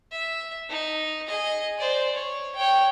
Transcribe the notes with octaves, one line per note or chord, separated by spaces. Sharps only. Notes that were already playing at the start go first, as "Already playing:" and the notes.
E5
D#4
G#4 D#5
C5 D5
C#5
C#5 G5